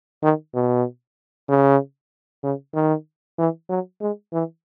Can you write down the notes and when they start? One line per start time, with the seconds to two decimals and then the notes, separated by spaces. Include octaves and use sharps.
0.23 D#3
0.55 B2
1.48 C#3
2.43 C#3
2.75 D#3
3.38 E3
3.69 F#3
4.01 G#3
4.33 E3